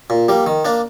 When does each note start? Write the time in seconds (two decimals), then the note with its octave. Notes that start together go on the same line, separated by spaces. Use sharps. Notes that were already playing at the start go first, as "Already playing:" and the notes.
0.10 A#2
0.28 G3 A#3
0.47 D#3
0.65 A#3 D4